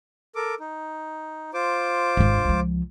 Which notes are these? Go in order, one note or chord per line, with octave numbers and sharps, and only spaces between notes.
A4 A#4 D6
D#4
F4 C5 D6
G#1 D4
C#2 F3